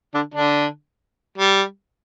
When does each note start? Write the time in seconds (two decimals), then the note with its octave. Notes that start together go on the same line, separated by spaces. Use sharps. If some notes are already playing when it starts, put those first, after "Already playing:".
0.14 D3 D4
0.34 D3 D4
1.38 G3